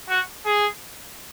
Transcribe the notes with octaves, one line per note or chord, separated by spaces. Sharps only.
F#4
G#4